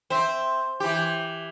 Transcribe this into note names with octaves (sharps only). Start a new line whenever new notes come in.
C4 C5 E5
E3 G4